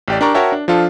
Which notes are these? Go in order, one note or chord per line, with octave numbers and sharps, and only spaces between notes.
A1 G4 D5
D4 G4 A#4 D5 A#5 C#6
F#4 A#4 C#5 E5 G5 A5
D4
F3 D4 F4 A4